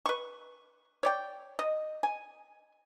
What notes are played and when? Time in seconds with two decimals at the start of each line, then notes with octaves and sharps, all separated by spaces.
0.06 B4 C#6
1.03 C#5 D5 G5
1.59 D#5
2.03 G#5